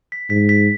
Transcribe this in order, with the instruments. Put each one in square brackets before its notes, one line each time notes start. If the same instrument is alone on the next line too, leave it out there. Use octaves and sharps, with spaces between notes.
[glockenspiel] B6
[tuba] G#2 [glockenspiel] B6
[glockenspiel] B6